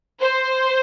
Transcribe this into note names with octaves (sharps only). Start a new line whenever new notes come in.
C5